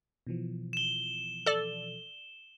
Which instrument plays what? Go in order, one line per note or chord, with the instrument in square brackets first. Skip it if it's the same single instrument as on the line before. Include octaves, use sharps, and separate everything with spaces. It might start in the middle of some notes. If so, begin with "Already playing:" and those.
[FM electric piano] B2 E3 F3
[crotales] E7 G7
[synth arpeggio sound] A4 D5